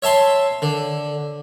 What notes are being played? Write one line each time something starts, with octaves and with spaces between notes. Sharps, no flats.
C#5 E5 A5 C6
D3